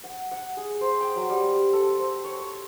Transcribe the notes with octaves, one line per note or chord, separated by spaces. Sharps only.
F#5
F#5
G#4
C5
G5
F#3
G3
A4
C4
C#5
C#6